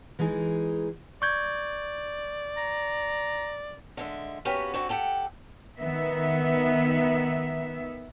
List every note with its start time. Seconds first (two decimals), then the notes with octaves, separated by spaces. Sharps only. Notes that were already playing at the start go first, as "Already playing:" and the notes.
0.19 E3 G#3 D#4 G#4
1.22 D5 C#6 G6 G#6
2.57 A#5
3.97 D3 G#3 E5
4.45 A#3 B3 C#4 F#4 G4 B4
4.74 D3 C4 F#4
4.89 G4 A4 F#5 G5
5.78 D#3 B3 E5